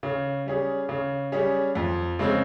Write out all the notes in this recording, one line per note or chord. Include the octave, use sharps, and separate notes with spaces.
C#3
G3 C#4 G#4
C#3
G3 C#4 G#4
F2
C#3 G#3 C4